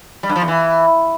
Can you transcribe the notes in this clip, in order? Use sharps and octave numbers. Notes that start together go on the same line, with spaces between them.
G3
G2
F3
E2
E3